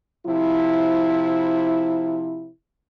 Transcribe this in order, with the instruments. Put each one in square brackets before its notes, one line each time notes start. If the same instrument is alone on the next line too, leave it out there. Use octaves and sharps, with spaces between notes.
[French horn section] C3 F3 E4